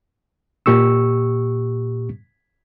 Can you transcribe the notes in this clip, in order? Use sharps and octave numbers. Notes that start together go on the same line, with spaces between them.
A#2 G4 C#6 E6